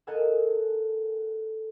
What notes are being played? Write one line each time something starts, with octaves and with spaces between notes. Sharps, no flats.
A4 A#4 D#5 F#5 G#5 E6